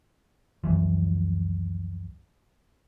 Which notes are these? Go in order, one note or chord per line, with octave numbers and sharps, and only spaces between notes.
C#2 F#2 E3 F3